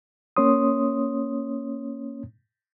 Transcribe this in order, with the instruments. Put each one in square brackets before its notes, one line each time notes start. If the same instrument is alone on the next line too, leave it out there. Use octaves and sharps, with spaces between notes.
[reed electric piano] A#3 C#4 C#5 C6 D#6